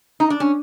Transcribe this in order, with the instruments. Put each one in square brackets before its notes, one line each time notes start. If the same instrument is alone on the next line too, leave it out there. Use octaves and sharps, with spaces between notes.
[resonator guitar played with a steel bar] D#4
D4
C#4